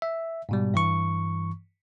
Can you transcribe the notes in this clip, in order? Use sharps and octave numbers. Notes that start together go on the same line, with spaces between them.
E5
G#2 B2 G3
G2 E3 C#6